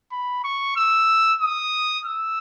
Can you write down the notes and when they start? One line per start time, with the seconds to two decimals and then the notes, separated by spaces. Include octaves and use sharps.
0.12 B5
0.44 C#6
0.76 E6
1.42 D#6
2.06 E6